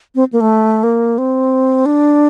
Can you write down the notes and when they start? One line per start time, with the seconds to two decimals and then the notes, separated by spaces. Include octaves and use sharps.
0.15 C4
0.33 A#3
0.41 A3
0.83 A#3
1.18 C4
1.86 D4